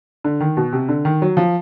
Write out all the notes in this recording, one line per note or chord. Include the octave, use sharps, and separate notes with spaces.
D3
D#3
B2
C3
D3
D#3
F#3
F3